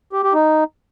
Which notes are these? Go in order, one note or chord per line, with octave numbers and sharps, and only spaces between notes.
G4
G4
D#4